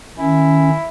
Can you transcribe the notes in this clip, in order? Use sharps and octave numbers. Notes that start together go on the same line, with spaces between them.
D#3 C#4 E4